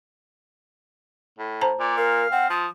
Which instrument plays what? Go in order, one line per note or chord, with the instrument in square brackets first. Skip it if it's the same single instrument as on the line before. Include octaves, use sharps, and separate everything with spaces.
[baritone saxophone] A2
[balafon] C5 A5 A#5
[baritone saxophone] A#2 [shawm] D5
[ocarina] A#4 [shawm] F5
[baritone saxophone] C4 [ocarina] F#5
[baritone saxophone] F3 [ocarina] D#6